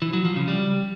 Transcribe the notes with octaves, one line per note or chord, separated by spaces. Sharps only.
E3
F#3
F3
C#3
G3